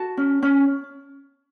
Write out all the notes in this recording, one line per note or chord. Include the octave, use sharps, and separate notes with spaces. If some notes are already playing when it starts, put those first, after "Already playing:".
Already playing: F#4 A5
C#4
C#4